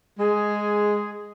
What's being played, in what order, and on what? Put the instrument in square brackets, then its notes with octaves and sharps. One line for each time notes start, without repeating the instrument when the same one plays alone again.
[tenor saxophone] G#3 [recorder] G#4